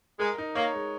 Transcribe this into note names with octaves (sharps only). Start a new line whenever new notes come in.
G#3 A#4
D#4
A#3 C#5
G#3